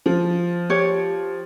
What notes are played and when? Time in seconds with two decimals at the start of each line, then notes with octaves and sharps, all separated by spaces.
0.06 F3
0.70 G4 C#5